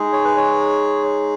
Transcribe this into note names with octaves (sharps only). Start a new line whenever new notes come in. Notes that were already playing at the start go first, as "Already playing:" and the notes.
Already playing: G#3 D#4 G#4
C#5
B4
C#5